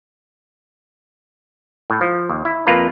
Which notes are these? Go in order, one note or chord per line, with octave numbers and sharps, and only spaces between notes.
A2
F3
D#2
E4
F2 A#3 F4 B4 A#5